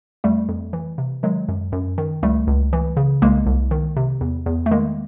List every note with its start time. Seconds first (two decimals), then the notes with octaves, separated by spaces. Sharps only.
0.24 F2 G3 A3
0.49 F2
0.73 E3
0.98 C3
1.23 D#3 F#3 G#3
1.48 F#2
1.72 F#2
1.98 D#3
2.23 C#2 G3 A3
2.47 C#2
2.73 E3
2.97 C#3
3.22 C2 G#3 A#3
3.46 C2
3.71 D#3
3.96 C3
4.21 E2
4.46 E2
4.66 A3
4.71 D#3 G#3 A#3